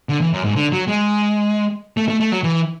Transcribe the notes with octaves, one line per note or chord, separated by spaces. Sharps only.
D3
E3
F#2
G#2
D3
F#3
G#3
A3
A3
A3
F#3
E3